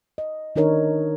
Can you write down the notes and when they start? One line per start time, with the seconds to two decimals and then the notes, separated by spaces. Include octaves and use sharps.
0.18 D#5
0.56 D#3 D4 D#4 A#4 C#5